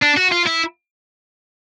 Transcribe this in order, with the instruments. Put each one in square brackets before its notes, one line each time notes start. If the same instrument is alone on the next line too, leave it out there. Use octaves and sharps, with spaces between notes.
[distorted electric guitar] D4
F#4
F4
E4